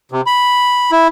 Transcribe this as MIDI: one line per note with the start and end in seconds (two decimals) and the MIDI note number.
0.12 0.21 48
0.26 0.91 83
0.91 1.08 64